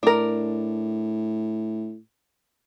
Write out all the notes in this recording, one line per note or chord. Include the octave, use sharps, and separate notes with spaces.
A2 D4 A#4